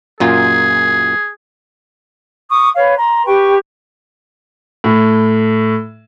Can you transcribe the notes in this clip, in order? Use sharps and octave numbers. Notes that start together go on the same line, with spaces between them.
F#2 A#2 F4 G#4
C#6 D#6
B4 C#5 F5
A#5 C6
G4 B4 G5 C#6
A2